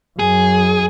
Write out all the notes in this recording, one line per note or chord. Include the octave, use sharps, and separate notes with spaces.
F#2 G#4